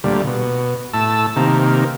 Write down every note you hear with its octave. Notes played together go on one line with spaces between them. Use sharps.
D2 A#2 G3
B2
A2 A5 E6
C3 D#3 A#3